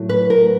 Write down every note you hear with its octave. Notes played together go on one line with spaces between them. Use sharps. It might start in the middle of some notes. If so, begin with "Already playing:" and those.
Already playing: A2 F#3
B4
A#4